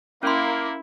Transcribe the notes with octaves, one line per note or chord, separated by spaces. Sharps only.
A#3 C#4 E4 C6